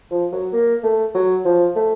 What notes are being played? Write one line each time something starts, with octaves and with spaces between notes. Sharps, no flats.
F3
F#3
A#3
A3
F#3
F3
A3